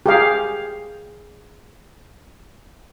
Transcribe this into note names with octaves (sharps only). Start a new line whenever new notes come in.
G4 G#4 F5